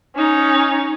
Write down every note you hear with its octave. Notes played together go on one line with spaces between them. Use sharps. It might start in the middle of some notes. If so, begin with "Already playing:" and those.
C#4 D#4